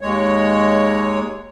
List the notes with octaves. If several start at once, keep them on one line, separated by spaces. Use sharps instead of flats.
D#2 G#3 C#5